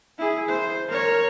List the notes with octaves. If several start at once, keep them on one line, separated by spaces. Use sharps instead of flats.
E4 G#4
C5
A#4 C#5